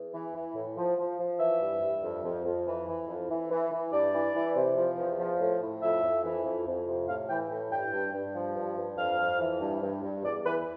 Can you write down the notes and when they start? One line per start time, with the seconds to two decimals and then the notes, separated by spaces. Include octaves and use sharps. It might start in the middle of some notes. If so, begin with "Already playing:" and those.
Already playing: E2
0.13 E3
0.34 E3
0.55 A2
0.76 F3
0.97 F3
1.18 F3
1.39 E3 E5
1.60 G2
1.81 G2
2.02 F2
2.23 F2
2.44 F2
2.65 E3
2.86 E3
3.07 F2
3.29 E3
3.49 E3
3.71 E3
3.91 G2 D5
4.13 E3
4.33 E3
4.55 C3
4.76 F3
4.97 E2
5.18 F3
5.39 A2
5.60 A2
5.81 F2 E5
6.02 F2
6.23 E3
6.44 F2
6.66 F2
6.87 C3
7.07 A2 F5
7.28 E3 G5
7.49 A2
7.71 G2 G5
7.92 G2
8.13 G2
8.34 F3
8.55 G2
8.76 G2
8.97 F2 F5
9.18 F2
9.39 E3
9.60 G2
9.81 G2
10.02 G2
10.23 E2 D5
10.44 E3 B4